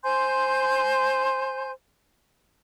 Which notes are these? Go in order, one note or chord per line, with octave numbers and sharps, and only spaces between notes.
C5 G#5 C6 G6